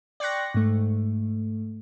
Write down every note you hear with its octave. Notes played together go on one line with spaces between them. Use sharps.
D5 G5 C6 C#6 F#6 A#6
G#2 A3